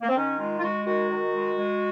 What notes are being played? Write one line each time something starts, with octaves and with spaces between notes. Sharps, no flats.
A#3
C4
D#3 C#4
G#3 F4
F4
G#3 F#4
D#3 F#4
D#3
G#3
G#3